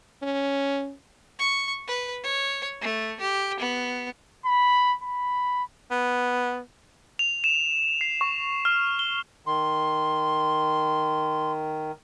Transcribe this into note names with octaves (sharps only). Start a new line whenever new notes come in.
C#4
C#6
B4
C#5
A3
G4
B3
B5
B5
B3
F7
E7
C7
C#6
F6
G7
D#3 C6